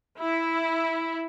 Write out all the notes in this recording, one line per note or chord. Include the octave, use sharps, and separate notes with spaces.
E4